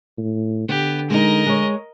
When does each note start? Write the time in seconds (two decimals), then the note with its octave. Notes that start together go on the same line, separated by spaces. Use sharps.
0.18 A2
0.69 D3 B3 G4
1.10 G#3 D#4 A#4 D#5
1.47 G#3 C#5